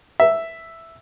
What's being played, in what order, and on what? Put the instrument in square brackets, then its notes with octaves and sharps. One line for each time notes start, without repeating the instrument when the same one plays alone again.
[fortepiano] E5